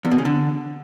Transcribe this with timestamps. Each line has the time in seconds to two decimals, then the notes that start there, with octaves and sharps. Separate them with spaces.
0.05 E2
0.11 B2
0.18 C#3
0.25 D3